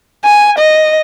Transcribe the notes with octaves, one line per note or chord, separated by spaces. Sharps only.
G#5
D#5